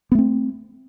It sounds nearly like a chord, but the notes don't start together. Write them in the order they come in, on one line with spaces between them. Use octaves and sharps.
B3 A3 C4